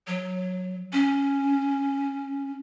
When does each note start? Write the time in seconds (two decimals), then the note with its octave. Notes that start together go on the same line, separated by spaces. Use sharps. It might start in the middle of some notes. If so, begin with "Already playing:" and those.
0.07 F#3
0.93 C#4